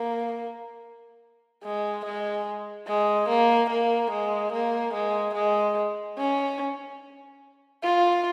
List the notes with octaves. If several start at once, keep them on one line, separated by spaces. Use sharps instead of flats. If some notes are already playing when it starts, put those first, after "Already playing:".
Already playing: A#3
G#3
G#3
G#3
A#3
A#3
G#3
A#3
G#3
G#3
C#4
F4